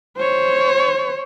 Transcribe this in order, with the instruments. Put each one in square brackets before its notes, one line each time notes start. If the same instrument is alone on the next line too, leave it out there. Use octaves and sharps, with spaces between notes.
[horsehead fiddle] C5 C#5